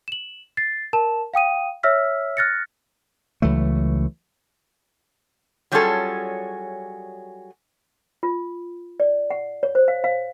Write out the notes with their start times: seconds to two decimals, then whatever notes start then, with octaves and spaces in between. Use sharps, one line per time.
0.08 E7 F#7
0.57 A6 C7
0.93 A#4 A5 E7
1.34 F5 G5 D#6 D#7
1.83 C#5 E5 E6 F6 B6
2.37 F6 F#6 A6 A#6 C#7
3.42 C#2 E3 F#3 A3
5.72 F#3 G3 C#4 F4 G#4 A4
8.23 F4
9.00 D5
9.30 F#5
9.63 C#5
9.75 C5
9.88 F5
10.04 F5